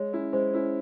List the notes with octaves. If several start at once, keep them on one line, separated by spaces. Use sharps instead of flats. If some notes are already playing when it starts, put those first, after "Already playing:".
Already playing: G#3 C#5
C#4 E4
G#3 C5
C#4 E4